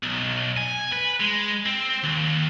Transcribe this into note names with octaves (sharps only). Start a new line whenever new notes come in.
B1
G#5
B4
G#3
C4
D#2